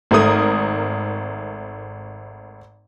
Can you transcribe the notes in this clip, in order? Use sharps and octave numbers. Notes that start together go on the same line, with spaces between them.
G#1 A3 A#4 D#6